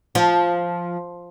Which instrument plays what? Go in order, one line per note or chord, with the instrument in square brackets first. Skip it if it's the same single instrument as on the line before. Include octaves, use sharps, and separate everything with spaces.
[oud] F3